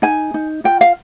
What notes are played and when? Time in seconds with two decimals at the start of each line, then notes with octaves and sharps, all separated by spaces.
0.02 D#4 G#5
0.34 D#4
0.64 F4 G5
0.81 F5